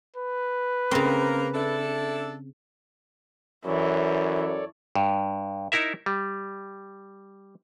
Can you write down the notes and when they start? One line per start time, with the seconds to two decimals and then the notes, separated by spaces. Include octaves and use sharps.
0.16 B4
0.91 C#3 A#3 C4 A#4
1.55 D4 E4 A4
3.66 F#2 E3 A4 C#5 D5
4.95 G2
5.72 D#4 E4 A#4 E5
6.06 G3